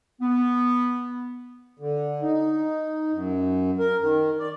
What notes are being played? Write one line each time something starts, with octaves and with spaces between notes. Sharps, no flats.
B3
D3
D#4
F#2
A#4
D#3
D5